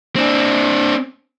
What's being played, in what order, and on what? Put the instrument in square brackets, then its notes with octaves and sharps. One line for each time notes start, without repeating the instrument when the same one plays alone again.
[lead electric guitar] C4 D4